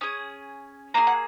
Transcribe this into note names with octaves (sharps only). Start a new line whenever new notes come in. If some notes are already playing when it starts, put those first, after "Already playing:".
C#4 G#4 D#6
A#3 D#4 G#4 A#5
F#5